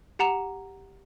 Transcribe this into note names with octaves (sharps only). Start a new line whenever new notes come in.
G4 F#5 A#5 E7